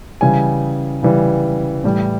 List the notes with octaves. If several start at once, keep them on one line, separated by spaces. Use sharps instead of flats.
C#3 E3 G3 G#5
C#3 E3 G3
A2 E3 G3